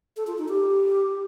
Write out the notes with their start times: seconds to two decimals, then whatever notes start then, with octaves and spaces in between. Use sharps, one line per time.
0.17 A4
0.27 F4
0.38 D#4
0.48 G4